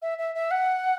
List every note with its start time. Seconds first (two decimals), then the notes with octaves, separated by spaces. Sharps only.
0.02 E5
0.18 E5
0.35 E5
0.51 F#5